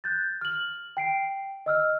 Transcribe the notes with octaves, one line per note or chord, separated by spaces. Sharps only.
F#6 G6 A6
F6 F#7
G5 C7 D7
D#5 E6 F6